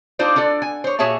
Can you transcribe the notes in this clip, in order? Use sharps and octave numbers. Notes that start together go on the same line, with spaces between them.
D4 D#4 F4 C5 D5
D4 F4 A4 D5
G#5
C5 C#5
A#2 F#4 G#4 C#5 E5 A5